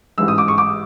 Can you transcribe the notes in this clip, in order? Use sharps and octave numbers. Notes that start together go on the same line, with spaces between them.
A1 G#2 E3 G#3 E6
D#6
D6
C#6
D6